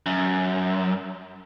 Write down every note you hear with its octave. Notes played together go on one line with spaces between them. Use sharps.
F#2